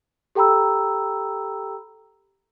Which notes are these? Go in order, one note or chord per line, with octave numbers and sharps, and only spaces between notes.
G4 A4 G5 A#5 B5 E6